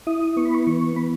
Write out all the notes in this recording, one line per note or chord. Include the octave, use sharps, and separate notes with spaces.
E4 D#6
B3 C#6
B5
C#6
E3 C#6
B3 B5